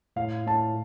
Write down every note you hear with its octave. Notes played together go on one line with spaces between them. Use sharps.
A2 F5
A2 A5